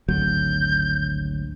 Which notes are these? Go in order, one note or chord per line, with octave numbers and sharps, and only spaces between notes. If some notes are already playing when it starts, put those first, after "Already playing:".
G#1 D2 F#3 G6